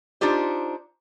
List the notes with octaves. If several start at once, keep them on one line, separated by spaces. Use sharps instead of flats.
D4 D#4 F4 G4 C5